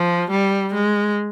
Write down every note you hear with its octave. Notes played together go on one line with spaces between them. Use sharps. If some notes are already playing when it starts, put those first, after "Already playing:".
Already playing: F3
G3
G#3